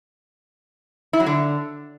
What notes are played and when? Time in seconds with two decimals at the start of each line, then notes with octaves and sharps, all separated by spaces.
1.13 E4
1.20 F#3
1.26 D3